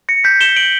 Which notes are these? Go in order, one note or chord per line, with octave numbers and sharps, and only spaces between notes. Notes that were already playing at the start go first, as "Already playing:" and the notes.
A#6 C#7
G6 B6
E7 G7
D7 F#7